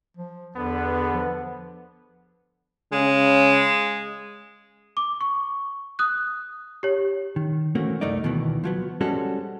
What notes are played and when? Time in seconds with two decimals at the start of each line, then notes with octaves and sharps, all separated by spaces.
0.17 F3
0.56 E2 D3 B3
1.14 F3
2.92 C#3 G#3
4.97 D6
5.21 C#6
5.99 D#6 F#6
6.83 G4 C#5
7.36 D#3
7.75 E3 A3 A#3 C4 C#4 F#4
8.01 C2 F#2 A3 A#3 D#4 D5
8.23 D2 B2 D#3 E3 B3
8.64 F3 F#3 B3
9.01 G3 G#3 C4 C#4 F#4 A4